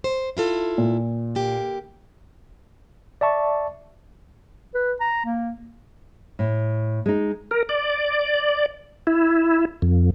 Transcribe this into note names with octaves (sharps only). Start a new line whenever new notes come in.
C5
E4 F4 A4
A#2
D3 A#3 G4
D5 E5 A5 C#6
B4
A#5
A#3
A2
G#3 D#4
A#4
D5
E4
F2